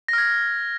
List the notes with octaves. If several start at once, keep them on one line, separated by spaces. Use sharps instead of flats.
F6 G#6 A#6